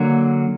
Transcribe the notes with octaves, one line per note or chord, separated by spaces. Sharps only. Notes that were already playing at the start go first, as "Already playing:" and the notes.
Already playing: D3 F#3 A#3